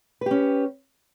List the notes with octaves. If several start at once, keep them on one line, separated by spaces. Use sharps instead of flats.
C#4 G4 B4